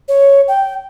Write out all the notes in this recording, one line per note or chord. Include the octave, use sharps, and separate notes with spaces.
C#5
G5